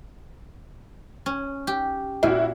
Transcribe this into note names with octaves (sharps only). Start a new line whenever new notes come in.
C#4
G4
A#2 E4 F#4